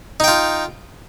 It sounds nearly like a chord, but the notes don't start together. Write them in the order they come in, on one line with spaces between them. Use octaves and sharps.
D#4 G5 F4